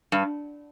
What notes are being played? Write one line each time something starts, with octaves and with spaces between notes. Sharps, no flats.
G2